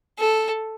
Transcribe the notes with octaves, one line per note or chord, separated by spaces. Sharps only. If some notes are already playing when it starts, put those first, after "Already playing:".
A4